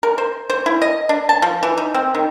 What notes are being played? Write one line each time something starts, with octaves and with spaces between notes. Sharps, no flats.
A#4
C5
C5
E4
D#5
D4
A5
F3
E3
D#4
C4
D#3